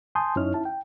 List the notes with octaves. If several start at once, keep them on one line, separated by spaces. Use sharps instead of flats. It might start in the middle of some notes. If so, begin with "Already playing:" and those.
G#5 A5 C6 D#6 G6
F#2 C#4 D#4 E4 C#5 F6
E4 A5
G5